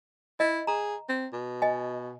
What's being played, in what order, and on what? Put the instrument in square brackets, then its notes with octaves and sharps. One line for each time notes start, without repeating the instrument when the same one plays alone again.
[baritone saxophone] E4 [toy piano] D#5
[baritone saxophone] G#4 [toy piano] A#5
[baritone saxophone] C4
B2
[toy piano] D#5 G#5